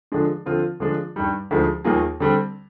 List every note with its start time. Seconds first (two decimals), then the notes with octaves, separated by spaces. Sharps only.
0.12 D3 F3 G#3 D4
0.46 D3 F3 C4 F4
0.80 D3 F3 G#3 D4 F4
1.16 G2 D#3 G3
1.51 D2 D3 F3 G#3 D#4
1.84 D#2 D#3 A#3 F4 G#4
2.20 D3 G3 C4